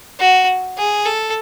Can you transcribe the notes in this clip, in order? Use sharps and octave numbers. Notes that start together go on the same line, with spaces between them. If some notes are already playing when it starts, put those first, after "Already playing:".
F#4
G#4
A4